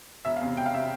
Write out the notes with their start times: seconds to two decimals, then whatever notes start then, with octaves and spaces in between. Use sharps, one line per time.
0.25 E1 E5
0.36 F5
0.41 E2 C3
0.57 E1 G5
0.66 F5
0.74 C3 E5